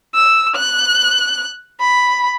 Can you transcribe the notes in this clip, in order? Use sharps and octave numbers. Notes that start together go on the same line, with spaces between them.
E6
F#6
B5